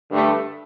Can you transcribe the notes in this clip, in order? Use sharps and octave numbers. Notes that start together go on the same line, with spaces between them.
G2 D3 A3